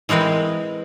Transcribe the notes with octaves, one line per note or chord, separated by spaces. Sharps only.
E3 G#3 C4 A#4 B4